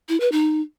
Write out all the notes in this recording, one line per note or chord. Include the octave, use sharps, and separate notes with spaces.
E4
B4
D#4